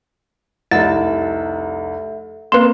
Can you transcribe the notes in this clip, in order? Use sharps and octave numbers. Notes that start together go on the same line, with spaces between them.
F1 C2 A4 E5 A6
A#3 C4 B4 F5 C6